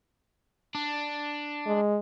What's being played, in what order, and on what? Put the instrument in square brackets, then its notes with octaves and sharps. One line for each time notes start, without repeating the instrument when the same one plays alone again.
[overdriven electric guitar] D4
[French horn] G#3